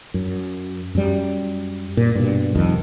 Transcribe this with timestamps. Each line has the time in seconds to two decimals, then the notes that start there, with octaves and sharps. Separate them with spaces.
0.14 F#2
0.95 F#2 G3
1.97 A#2
2.15 G2 B2
2.55 C2 F2 D#3